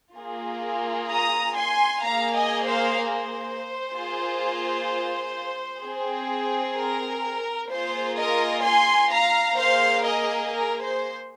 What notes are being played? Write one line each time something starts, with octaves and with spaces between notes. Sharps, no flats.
A#3 F4 G#4
A#5 D#6
G#5 C6
A#3 G#4 F5 A#5
D#5 G#5
C5 F5
C5
A#3 F4 G#4
C4 G#4
A#4
A#3 F4 G#4 C5
A#4 D#5
G#5 C6
F5 A#5
A#3 G#4 C5 F5
A#4 D#5
A#4
C5